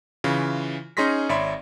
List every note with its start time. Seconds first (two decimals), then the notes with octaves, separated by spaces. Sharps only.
0.24 C#3 E3 F4
0.97 C#4 D#4 G#4 C6 A#6 B6
1.29 G#1 C#5 D5 E5 B5 C6